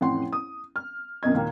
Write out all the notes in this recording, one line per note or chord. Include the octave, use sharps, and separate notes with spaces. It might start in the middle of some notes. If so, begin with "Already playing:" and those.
A1 F2 F#5 C6
D#6
F6
C2 F#2 B2 D#5 G#6
D#2 A#2 A#3